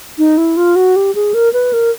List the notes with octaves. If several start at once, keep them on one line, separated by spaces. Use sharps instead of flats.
D#4
E4
F4
F#4
G4
G#4
A#4
B4
A#4